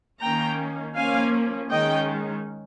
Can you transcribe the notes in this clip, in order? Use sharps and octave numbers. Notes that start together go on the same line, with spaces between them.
D#3 A#3 C#4 G5 A#5
F3 A#3 C#4 F5 G#5
D#3 G#3 C#4 D#5 G5